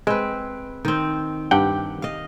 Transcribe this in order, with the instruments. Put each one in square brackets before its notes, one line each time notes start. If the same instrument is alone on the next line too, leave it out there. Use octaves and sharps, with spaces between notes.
[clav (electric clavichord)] G#3 [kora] C4 B4
[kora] D#3 C4
[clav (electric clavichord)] G2 F#5 G5 [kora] G4
[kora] D#5 F5